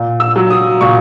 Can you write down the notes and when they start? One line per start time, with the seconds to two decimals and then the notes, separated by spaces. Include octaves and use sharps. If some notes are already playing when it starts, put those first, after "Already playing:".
Already playing: A#2
0.20 E6
0.36 F#3
0.50 D#6
0.81 A#2 C#6